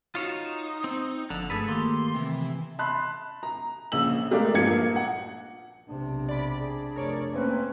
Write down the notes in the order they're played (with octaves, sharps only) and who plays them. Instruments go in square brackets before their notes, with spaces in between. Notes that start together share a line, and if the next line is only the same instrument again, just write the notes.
[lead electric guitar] D#4 [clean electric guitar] F4 C#5 [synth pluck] F#4 E7
[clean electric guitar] C4
[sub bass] F#1 [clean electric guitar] D3 [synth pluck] F3
[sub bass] G2 [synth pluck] A3 E6 [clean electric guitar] G#4 A4 B4
[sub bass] D#3 [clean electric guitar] A#3 G4 [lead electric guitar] C6
[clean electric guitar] C3 [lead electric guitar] E3
[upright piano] A5 B5 C6 F#6
A#5
A#1 C#3 E6 F#7
G#3 A3 G4 A#4 D5 F5
A#1 G2 A#3 F4 G#6 C#7
F#5
[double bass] B1 C3 [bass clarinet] D4
[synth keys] D5 B5
[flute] G#4
[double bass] F1 [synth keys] A#4 C#5 D5
[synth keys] A3 A#3 [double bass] C4 C#4 [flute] B4